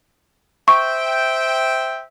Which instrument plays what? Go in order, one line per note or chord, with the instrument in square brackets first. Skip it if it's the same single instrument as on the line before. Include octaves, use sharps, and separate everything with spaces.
[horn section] C5 E5 G5 [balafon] C#6